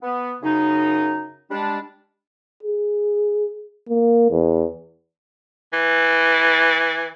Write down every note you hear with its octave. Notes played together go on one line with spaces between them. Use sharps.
B3
F#2 C#3 D#4
G3 G#3 D4
G#4
A#3
E2
E3